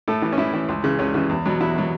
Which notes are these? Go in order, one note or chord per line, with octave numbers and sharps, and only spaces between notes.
A2 A4
E3
C#4
A2 E4
E3
C#2
C#3 E3
C#2 C#4
C#3 E3
E2
B2 F#3
E2 E4
B2 F#3